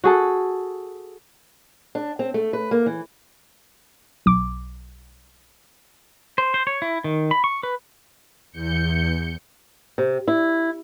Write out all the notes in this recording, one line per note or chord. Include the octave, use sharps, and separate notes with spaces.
F#4 G#4 A4
D4
C4
A3
B4
A#3
E3
B1 D6
C5
C5
C#5
E4
D#3
B5
C#6
B4
E2 G6 C#7
C3
E4